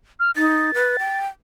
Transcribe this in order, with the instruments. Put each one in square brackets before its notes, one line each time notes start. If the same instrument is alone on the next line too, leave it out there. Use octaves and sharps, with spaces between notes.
[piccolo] F6
[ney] D#4 [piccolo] A6
[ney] B4
G5